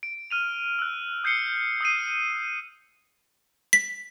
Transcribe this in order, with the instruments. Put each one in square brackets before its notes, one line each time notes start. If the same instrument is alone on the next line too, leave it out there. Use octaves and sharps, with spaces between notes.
[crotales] D7
F6 D#7 F7
E6 F#6
D#6 G6 C7 C#7 G7
D#6 E6 G6 C7 D#7
[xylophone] B6